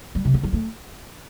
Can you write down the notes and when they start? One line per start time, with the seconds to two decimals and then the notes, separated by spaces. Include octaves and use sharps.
0.15 G3
0.25 C3
0.34 D3
0.44 G3
0.53 A3